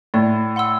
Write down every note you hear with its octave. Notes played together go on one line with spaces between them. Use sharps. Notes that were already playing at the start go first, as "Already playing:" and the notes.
A2 D5
F#5 C6 E6